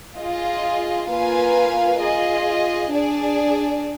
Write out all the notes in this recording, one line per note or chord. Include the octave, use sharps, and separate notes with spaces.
F4 G#4 D#5
A#3 F4 B4 F5 G#5
F4 G#4 D#5
D4 G#4 D5